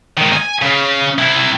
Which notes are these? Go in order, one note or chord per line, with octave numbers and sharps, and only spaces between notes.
G#2 D#3
G#5
C#3
C3 E4